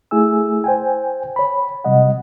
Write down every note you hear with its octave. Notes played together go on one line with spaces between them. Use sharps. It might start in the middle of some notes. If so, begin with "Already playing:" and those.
A3 E4 G#4 G#5 E6
C5 G5 G#5
C#5 B5
C3 F#3 G3 D#5 F#5